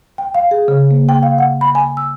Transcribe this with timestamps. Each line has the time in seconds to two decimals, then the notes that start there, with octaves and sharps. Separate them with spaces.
0.18 G5
0.35 F5
0.51 G#4
0.68 C#3
0.91 A#3
1.09 G5
1.23 F5
1.38 F#5
1.61 B5
1.75 G#5
1.97 E6